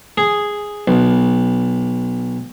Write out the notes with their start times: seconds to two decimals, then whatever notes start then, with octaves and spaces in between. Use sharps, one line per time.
0.18 G#4
0.88 B1